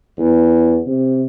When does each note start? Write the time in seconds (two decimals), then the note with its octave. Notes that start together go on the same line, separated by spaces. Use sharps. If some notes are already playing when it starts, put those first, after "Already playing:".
0.18 E2
0.86 C3